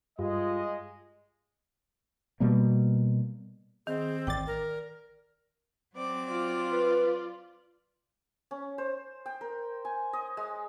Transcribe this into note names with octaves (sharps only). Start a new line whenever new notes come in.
G2 G#3 F4 D#5
B2 G3 A#3
D#3 C4 G#4
A1 D5 G5 D6 A6
A#4
F#3 C4 D5 D6
F4 D5
B4
C#4
C5
G5
A#4
G#5
D#5
G#3